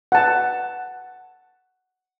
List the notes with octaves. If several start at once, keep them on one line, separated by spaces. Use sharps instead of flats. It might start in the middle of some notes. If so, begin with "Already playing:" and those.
F#5 A5